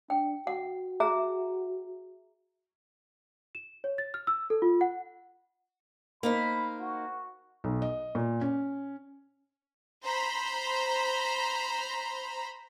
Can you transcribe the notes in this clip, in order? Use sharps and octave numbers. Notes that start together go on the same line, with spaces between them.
D4 G5
F#4 F#5
G#4 E5 A#5
E7
C#5
A6
F6
E6
A4
F4
F#5
A#3 D#4 C5 B5
F#4
B1
D#5
A#2
C#4
C5 A#5 B5